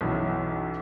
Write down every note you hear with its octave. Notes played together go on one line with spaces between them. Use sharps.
B1 F#2 E3 F#3